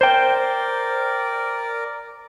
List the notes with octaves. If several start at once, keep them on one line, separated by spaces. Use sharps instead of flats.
A#4 C5 D5 G5